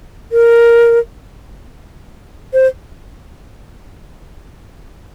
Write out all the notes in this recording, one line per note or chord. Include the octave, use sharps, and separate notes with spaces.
A#4
C5